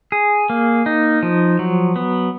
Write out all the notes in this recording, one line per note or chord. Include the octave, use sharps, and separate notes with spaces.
G#4
A#3
D#4
F3
F#3
B3